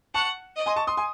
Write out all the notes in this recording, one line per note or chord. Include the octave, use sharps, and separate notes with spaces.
F#5 A5 C#6
D#5
G#5 C6
A5 C#6
C6 D#6
G#5 C6